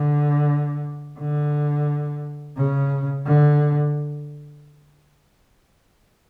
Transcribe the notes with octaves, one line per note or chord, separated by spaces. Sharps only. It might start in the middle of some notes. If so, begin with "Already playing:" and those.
Already playing: D3
D3
C#3
D3